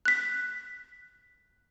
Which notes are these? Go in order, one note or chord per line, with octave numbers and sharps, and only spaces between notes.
F#6 B6